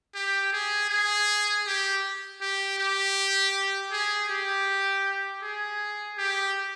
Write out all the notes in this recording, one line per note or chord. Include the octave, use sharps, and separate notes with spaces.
G4
G#4
G#4
G4
G4
G4
G#4
G4
G#4
G4